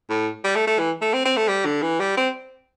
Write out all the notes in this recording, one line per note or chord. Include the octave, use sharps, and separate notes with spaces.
A2
G3
A3
A3
E3
A3
C4
C4
A3
G3
D3
E3
G3
C4